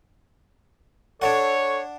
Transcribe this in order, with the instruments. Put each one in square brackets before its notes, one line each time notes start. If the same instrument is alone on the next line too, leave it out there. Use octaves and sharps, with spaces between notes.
[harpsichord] D4 D5 F#5 [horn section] A4 C#5